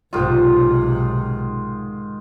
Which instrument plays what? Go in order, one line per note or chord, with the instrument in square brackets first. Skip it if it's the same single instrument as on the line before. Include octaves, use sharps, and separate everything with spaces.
[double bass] B1 C3 [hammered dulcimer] G#2 D#3 F4